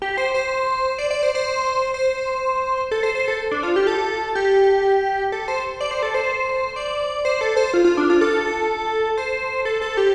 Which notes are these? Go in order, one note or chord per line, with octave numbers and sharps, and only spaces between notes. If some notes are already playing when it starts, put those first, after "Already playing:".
G4
C5
C5
D5
D5
C5
C5
C5
A4
C5
C5
A4
D4
F4
G4
A4
G4
A4
C5
D5
C5
A4
C5
D5
C5
A4
C5
F4
F4
D4
F4
A4
C5
A4
A4
G4